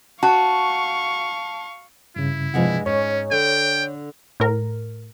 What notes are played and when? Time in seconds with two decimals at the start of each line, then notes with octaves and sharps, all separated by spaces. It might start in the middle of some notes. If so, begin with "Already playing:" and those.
0.23 F#4 F5 A5 C#6
2.16 G2 C#3 E4
2.54 G2 C3 F3 G#3 F#5
2.86 G#2 C#4 C#5
3.31 D3 G5
4.40 A2 A#4